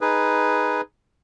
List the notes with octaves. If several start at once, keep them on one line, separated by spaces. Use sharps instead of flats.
D#4 G#4 B4